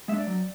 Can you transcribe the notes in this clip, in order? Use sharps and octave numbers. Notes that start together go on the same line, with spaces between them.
G#3 D4 E5
D5
F#3